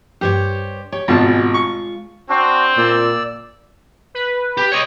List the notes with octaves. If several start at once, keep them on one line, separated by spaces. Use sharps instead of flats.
G2 G4 C5 C#5
G4 C#5
G#1 B2 G#3 F4 A5
C#6
C4 D4 F#4
A#2 D5 E6
B4
G4
C#5 D#5 C#6